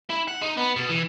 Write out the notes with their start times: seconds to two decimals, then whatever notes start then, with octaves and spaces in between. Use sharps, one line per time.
0.10 E4
0.28 F#5
0.42 D#4
0.57 B3
0.76 B2
0.89 E3